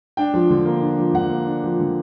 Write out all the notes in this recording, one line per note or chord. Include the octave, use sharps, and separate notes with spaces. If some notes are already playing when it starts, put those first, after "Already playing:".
D4 G5
F3
D3
A#3
D4
F3
D3 F#5
A#3
D4
F3
D3